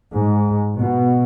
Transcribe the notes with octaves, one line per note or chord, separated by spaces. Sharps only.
G#2
B2